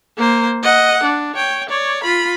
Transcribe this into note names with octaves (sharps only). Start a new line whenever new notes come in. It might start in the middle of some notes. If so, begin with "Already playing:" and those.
A#3 C5
D#5 F#5
D4
C#5 G5
C#5 D5
F4 B5